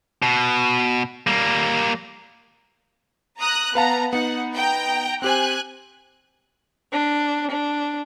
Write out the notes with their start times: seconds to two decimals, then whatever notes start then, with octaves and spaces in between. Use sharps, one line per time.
0.22 B2
1.27 G3 A#3
3.40 A#5 D#6 F#6
3.75 B3 B4 F5 A5 A#5
4.13 B3 D#4 F#5
4.55 G5 A#5
5.22 C4 G4 C5 G#5 F#6
6.91 D4
7.50 D4